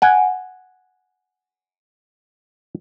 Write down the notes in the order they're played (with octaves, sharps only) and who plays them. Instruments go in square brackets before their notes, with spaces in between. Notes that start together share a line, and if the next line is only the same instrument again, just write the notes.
[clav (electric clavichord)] F#5 G#5